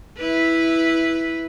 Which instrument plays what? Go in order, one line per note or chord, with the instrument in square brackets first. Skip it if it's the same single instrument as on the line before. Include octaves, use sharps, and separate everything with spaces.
[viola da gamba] E4 B4